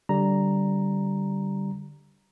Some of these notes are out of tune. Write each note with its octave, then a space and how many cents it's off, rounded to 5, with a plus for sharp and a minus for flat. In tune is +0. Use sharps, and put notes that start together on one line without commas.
D3 +0 G3 -10 A#5 +0